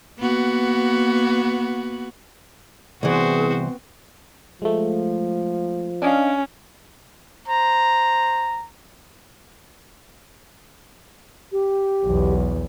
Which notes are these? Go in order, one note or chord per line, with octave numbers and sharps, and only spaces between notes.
A#3 B3 F#4
C2 E3 B3 C4 F#4 G#4 C5
F3 G#3 A3
C#4 D4 D#5 F5
C5 A#5
G4
B1 E2